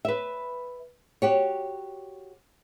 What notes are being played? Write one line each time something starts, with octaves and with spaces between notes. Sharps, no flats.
B4 E5
F#4 G4 C#5